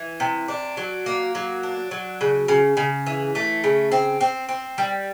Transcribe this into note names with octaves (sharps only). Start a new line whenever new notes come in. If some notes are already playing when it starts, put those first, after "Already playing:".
Already playing: E3
C3
D4
F#3
A#3
F#3
D4
F#3
C#3
C#3
C#3
E3
A3
C#3
C4
C4
C4
G3